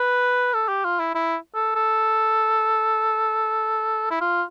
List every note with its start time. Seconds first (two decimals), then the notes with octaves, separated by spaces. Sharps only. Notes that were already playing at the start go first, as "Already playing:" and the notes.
Already playing: B4
0.54 A4
0.68 G4
0.84 F4
0.99 E4
1.15 E4
1.55 A4
1.75 A4
4.10 E4
4.21 F4